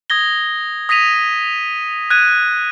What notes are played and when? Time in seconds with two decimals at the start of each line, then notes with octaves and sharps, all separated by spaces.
0.10 D#6 G#6 A#6 G7
0.89 D#6 A#6 B6 D#7 F7
2.10 F#6 G#6 D#7